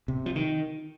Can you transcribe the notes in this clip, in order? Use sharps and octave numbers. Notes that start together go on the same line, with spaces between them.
C3
F3
D#3